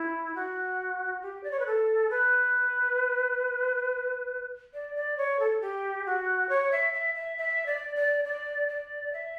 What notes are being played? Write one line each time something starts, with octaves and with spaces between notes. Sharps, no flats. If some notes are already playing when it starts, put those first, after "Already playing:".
Already playing: E4
F#4
G4
D5
C#5
B4
A4
B4
D5
D5
C#5
A4
G4
F#4
C#5
E5
E5
E5
E5
D5
D5
D5
D5
E5